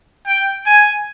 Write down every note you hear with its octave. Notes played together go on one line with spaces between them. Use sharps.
G5
G#5